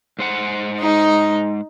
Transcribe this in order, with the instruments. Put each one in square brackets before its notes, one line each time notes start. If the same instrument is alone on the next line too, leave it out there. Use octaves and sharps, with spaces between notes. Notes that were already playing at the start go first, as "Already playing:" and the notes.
[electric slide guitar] G#2 C5 F#5
[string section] D#4